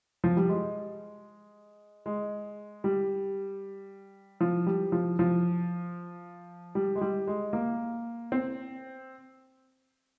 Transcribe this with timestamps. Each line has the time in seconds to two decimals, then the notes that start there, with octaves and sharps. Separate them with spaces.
0.24 F3
0.37 G3
0.49 G#3
2.06 G#3
2.84 G3
4.41 F3
4.66 G3
4.92 F3
5.19 F3
6.75 G3
6.96 G#3
7.01 G3
7.27 G#3
7.53 A#3
8.32 C4